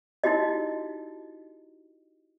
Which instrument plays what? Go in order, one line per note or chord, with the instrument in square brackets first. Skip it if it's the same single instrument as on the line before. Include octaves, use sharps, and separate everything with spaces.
[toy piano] D#4 E4 F#4 G4 D#5